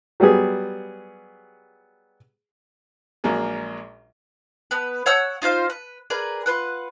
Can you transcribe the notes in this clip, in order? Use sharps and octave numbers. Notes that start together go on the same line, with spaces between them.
F#3 G3 B3 G#4
A#1 F#3 G#3 A#3 G#4
B3 B4
C#5 F#5 E6 G6
D#4 F4 C5 F5
B4
G#4 A#4 B4 D5
F4 B4 F#5